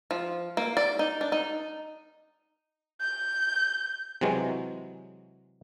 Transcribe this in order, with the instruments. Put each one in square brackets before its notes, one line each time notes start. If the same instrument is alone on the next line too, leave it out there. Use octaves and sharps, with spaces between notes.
[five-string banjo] F3
A#3
D5
D#4
D4
D#4
[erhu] G6
[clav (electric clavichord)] C3 E3 F#3 G#3